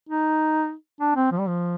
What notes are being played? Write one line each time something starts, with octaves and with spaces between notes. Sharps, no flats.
D#4
D4
C4
F3
G3
F3